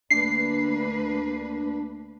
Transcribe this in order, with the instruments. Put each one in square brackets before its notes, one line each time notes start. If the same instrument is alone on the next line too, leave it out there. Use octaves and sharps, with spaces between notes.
[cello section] D2 A#3 B4 [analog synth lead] D4 [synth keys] C7